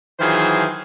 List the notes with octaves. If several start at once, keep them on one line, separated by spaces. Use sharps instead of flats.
D#3 E3 F#3 F4 G#4 C5